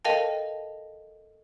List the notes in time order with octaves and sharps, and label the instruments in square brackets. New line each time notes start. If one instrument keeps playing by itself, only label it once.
[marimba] A4 A#4 D#5 F5 G5 A5